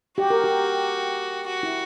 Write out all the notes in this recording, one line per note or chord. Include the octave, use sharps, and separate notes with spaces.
F#4 G4
A#4
G4
F#4
E4